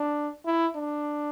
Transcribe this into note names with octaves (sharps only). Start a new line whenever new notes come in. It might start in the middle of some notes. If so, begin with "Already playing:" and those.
Already playing: D4
E4
D4